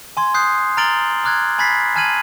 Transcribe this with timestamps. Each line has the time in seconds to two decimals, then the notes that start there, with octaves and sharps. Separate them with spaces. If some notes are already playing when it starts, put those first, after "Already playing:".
0.17 G#5 C6 G#6
0.34 D#6 F#6 G6 C7
0.77 A#5 F6 A6 D7 F#7 G7
1.24 A#5 D6 F6 F#6 G#6
1.58 G#5 B5 G#6 A6 B6 C7
1.95 G#5 A5 F6 G#6 D#7 F#7